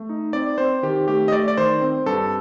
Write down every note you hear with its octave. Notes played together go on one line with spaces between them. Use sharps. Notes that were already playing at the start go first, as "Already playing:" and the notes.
Already playing: A3
D#4
C4 D5
C4 C5
D#3 G4
A3 G4
D#5
A3 D5
D5
D#3 C5
C4
G2 A4